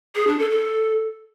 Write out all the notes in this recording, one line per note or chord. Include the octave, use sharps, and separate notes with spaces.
G#4
D4
A4
A4